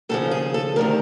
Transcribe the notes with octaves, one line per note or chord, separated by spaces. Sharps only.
D#2 C#3 F3 A4
G#4
A4
D2 C3 D#3 A#4